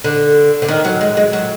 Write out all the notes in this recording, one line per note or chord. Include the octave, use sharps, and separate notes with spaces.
D3
D3
D#3
F#3
G#3
G#3
F#3